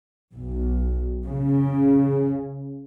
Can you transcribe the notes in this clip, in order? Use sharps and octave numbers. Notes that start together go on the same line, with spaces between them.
B1
C#3